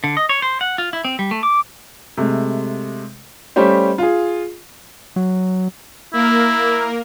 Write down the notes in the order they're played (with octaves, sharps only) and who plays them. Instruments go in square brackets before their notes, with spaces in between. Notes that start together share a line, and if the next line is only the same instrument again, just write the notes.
[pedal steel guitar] D3
D#5
C#5
C5
F#5
F4
E4
C4
G3
A3
D6
[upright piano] C3 G#3 A3
G3 A3 C#4 G4 C5
F4 G#4
[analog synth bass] F#3
[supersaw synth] A#3 A#4 [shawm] E4